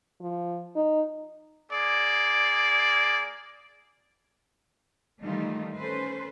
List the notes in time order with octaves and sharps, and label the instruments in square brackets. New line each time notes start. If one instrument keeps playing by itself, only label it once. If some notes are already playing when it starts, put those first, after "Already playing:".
[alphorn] F3
D#4
[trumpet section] A#3 G#4 D5
[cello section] D#3 E3 G3 A3 D#4 F4
C#4 A4 B4 C5